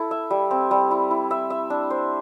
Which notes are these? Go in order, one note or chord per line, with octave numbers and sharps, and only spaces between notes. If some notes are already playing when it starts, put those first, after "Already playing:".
Already playing: E4 A4
E5
G3
C4
G3
E4
E4
E5
E5
D4
C5